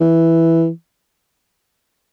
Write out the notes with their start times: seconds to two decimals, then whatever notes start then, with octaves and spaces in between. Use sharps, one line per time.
0.01 E3